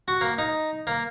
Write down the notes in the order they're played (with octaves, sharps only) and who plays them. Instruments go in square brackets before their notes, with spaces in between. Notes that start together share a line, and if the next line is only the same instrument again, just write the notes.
[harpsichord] F#4
A#3
D#4
A#3